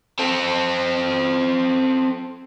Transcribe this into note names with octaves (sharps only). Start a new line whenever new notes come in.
C4 A4